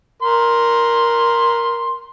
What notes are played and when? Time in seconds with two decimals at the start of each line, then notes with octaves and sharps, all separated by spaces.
0.23 A#4 C6